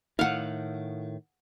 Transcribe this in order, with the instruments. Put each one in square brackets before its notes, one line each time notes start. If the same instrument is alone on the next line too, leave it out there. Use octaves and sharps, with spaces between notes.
[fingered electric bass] A2 D#3 [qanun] F5 F#5